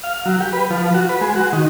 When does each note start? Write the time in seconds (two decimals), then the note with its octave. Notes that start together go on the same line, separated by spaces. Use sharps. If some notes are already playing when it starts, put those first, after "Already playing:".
0.04 F5
0.26 F#3
0.41 G4
0.53 B4
0.70 F3
0.94 F#4
1.09 B4
1.21 G#3
1.36 F#4
1.53 D#3